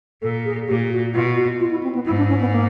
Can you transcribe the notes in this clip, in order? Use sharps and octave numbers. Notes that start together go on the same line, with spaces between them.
A#2 A4
G#4
A#2 G4
F#4
B2 F4
F#4
F4
E4
C4
B3
G#2 E4
D4
C#4
B3
A#3